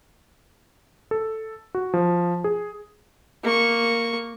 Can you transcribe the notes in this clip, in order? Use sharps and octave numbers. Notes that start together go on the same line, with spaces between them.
A4
F#4
F3
G#4
A#3 C#6